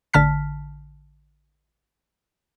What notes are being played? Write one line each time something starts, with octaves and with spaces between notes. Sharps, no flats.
A1 D3 A5 F6 B6